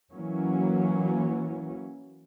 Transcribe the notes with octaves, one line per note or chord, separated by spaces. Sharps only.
E3 F#3 A#3 C#4